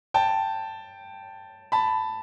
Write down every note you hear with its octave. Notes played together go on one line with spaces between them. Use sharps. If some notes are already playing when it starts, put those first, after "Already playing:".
G5 A5
A5 B5